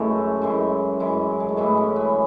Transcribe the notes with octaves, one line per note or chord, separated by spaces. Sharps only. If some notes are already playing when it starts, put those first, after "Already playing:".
Already playing: F#2 E3 G#3 A3
F#2 E3 G#3
F#2 E3 G#3
G#3
A3
F#2 E3 G#3 B3
C#4
B3